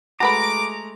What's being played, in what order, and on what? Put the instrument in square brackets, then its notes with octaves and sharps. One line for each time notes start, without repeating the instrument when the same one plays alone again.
[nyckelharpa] G#3 A3 [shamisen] F#4 B4 B5 [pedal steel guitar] A#5 [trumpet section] D6